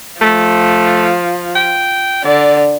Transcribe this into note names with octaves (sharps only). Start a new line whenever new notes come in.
F3 A3
G5
D3 D5